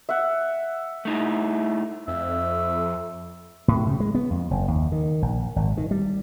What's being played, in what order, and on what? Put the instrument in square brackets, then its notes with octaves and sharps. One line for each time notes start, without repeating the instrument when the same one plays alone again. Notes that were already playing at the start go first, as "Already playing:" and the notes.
[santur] E5 F#5
[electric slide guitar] A3 D#4 E4
[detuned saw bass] F2 [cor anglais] E5
[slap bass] A2
C#3
G#3
B3
F2
F#1
D#2
D#3
A#1
G#1
D#3
G3